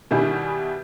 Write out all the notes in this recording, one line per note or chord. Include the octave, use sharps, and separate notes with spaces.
B2 D#3 G3 E4 G#4